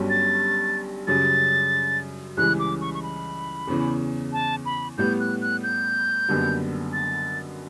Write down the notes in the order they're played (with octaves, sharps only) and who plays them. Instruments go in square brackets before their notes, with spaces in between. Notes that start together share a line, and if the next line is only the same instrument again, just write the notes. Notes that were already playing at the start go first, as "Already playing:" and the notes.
Already playing: [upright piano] G1 G2 F#3 C#4 G4
[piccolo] A6
[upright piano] F#2 C#3 G3 [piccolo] A6
[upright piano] C#2 C#3 E3 G3 [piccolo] F#6
[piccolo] D6
C#6
C#6
B5
[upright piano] E2 C#3 E3
[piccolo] A5
B5
[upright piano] A2 G3 B3 [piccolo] G6
[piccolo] F#6
F#6
G6
[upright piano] F#1 F#2 D3 G3 B3
[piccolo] A6